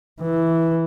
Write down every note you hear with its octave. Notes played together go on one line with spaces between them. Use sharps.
E3